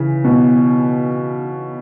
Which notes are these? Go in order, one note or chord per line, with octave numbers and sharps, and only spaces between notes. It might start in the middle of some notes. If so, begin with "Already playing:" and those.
Already playing: C#3 E3
B2